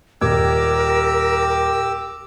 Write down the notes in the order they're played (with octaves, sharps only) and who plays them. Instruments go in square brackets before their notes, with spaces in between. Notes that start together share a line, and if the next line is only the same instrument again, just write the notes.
[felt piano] D#1 G#6 [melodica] G4 D6 E6 [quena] A#4